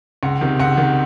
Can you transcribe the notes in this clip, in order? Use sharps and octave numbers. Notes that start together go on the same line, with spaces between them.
C#2 F#5
C3 D#3
C#2 F#5
C3 D#3